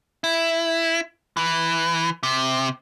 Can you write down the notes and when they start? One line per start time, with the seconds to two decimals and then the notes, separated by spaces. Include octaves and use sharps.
0.24 E4
1.37 E3
2.23 C3